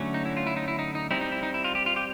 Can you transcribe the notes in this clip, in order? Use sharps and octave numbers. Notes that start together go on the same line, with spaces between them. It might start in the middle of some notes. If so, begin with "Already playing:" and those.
Already playing: D3 F#3 A3 C#4
D#4
E4
F4
E4
D#4
E4
D#4
D#4
G3 C4 D#4 E4
D#4
E4
D#4
E4
F4
G4
F4
G4